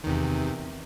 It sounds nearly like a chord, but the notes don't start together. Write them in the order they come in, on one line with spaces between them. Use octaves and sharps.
D#3 E2 C3